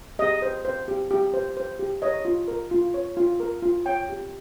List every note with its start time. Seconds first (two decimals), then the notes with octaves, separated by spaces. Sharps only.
0.19 G4 D#5
0.42 C5
0.65 C5
0.88 G4
1.11 G4
1.34 C5
1.57 C5
1.79 G4
2.02 C#5 D#5
2.25 F4
2.48 A#4
2.71 F4
2.94 C#5
3.17 F4
3.40 A#4
3.62 F4
3.85 C#5 G5
4.09 G4